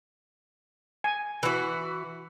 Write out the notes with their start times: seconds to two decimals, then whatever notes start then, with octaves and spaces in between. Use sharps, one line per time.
1.04 G#5
1.43 E3 F#4 B4